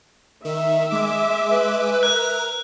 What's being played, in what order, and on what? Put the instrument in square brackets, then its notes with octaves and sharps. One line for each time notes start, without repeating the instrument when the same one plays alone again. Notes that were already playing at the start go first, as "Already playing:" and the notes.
[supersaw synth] D#3 [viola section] E5
[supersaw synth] G#3 D6
[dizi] B4
[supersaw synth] A#4 [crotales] F#6